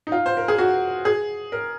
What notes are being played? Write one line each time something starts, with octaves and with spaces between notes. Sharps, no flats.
D#4
F4
C5
A#4
G#4
F#4
G#4
A#4